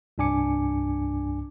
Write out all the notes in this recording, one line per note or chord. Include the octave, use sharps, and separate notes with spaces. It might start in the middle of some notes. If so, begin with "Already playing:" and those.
C2 G2 D4 G#5 D6 C#7